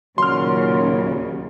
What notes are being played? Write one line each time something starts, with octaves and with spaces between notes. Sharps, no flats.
D#2 A#2 C#3 F#3 C6 F6